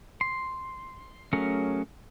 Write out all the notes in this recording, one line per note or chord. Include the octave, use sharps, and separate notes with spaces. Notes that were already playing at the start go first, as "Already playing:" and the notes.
C6
F#3 A3 C#4 G#4 A#4